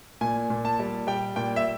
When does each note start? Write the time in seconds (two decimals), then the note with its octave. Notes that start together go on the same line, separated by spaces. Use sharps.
0.21 A#2 G#5
0.50 A#2
0.65 A5
0.79 G3
1.07 G3 G5
1.36 A#2 G5
1.56 E5